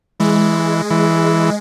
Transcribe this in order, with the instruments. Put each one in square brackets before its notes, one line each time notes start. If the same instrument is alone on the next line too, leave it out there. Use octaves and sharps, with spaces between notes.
[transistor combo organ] E3 [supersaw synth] G#3
[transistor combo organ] E3